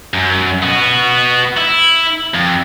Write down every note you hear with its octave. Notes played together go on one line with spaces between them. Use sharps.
F#2
B3 F#4
E4
F2